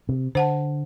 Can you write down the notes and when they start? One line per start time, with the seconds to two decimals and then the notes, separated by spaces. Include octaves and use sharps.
0.09 C3
0.35 D3 C5 F#5 A5